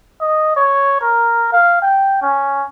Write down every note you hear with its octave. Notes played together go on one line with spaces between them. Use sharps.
D#5
C#5
A#4
F5
G5
C#4